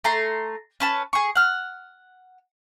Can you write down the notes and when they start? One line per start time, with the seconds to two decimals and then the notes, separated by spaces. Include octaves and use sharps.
0.04 A3 A#5 C6
0.80 C#4 B4 A5
1.13 G#4 C#6
1.35 F#5 F6